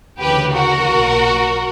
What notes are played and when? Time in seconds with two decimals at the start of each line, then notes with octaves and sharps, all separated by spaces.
0.19 D2 C#3 E3 G4 B4
0.53 F#4 A#4
0.86 B1 A#2 F#3